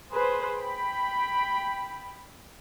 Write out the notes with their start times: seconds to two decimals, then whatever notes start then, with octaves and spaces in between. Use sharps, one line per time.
0.12 G#4 B4 C5
0.60 G5 B5